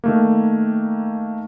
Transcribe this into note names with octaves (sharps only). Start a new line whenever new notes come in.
D#3 A3 A#3